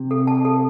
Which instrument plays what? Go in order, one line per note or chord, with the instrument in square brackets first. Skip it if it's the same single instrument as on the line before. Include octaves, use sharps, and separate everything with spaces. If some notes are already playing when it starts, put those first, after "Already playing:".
Already playing: [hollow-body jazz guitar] C3
[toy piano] A4
A5
A4